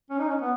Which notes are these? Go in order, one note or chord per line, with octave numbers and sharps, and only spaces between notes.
C#4
D#4
C#4
B3